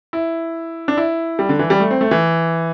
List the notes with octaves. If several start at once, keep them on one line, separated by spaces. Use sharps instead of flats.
E4
D4
E4
G3
D3
E3
G3
A3
C4
A3
E3